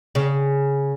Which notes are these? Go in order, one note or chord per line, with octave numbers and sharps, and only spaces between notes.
C#3